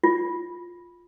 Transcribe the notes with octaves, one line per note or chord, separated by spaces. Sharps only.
F4